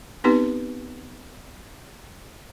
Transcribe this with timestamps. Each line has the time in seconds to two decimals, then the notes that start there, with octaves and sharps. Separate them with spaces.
0.24 B3 C4 D#4 G4 B4